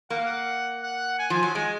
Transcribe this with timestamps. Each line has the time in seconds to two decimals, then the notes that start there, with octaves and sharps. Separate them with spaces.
0.10 A#3 F#5
0.18 F5
0.26 F#5
0.83 F#5
1.19 G#5
1.30 F3 G#5
1.43 F#3
1.55 G#3 G#5